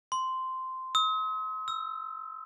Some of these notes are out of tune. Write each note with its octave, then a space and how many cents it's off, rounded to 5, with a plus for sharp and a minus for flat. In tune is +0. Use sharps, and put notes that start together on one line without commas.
C6 -10
D#6 +45
E6 +5